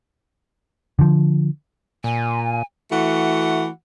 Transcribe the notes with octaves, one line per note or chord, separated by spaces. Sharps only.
D3 F3
A#2 G#5
E3 A3 F#4 F#5